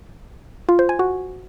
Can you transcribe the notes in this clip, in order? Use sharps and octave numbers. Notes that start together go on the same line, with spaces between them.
F4
C5
G#5
F#4